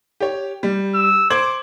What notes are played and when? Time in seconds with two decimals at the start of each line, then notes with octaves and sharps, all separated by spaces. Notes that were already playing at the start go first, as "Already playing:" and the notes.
0.20 G4 C#5
0.63 G3
0.95 E6
1.30 C5 D6 G#6 F#7